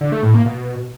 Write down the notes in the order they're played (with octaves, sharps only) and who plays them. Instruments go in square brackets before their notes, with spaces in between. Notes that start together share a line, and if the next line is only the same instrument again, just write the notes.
[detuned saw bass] D3
A3
A2
A#3
B2